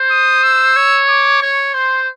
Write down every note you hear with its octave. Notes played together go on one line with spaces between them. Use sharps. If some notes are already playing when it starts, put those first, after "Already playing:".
Already playing: C5
D#6
E6
C#5
D6
C#5 C#6
C5 C6